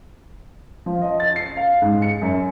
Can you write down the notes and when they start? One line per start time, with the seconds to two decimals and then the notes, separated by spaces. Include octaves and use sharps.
0.86 F3
1.02 D#5
1.20 A6
1.36 C7
1.57 F5
1.82 G#2
2.02 C#7
2.22 F#2